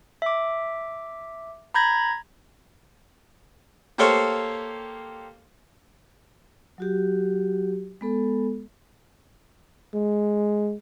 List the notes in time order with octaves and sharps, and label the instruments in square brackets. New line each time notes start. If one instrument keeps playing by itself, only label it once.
[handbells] E5 D6
A#5 B5 G6 G#6 A#6
[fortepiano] A#3 G4 A4 C5 C#5 F5
[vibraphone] F#3 F#4 G4
G#3 B3 A4
[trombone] G#3